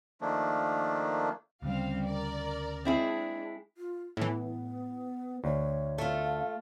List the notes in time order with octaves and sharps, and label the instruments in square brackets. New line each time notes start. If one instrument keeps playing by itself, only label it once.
[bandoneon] D#3 F3 A3 A#3 D4
[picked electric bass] D2 C#3 [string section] G3 C4 F5
[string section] A#4 D5
[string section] G#3 D4 [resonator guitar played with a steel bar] C4 E4 G#4
[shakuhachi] F4
[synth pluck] A2 E3 [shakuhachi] B3
[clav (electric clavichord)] D2 [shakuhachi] C#5
[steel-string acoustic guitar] A3 F4
[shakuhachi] F5